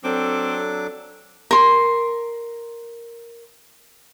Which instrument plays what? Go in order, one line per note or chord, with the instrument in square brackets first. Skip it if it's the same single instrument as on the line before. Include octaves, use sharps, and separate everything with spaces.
[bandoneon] F#3 D4 D6 [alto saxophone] C4 [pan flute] A4
[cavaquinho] A#4 C6